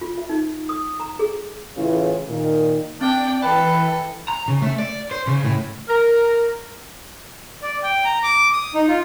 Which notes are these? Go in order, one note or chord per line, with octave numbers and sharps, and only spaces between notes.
F4
E5
D#4
D#6
A#5
G#4
A2 C#3 E3 E4 F4 G#4
A#2 D#3
C4 D4 D5 G5
E3 A4 B4 G5
A#5
C#3
A3
D5
C5
C#3
A2
A#4
D5
G5
A#5
D6
D#6
D#4
F4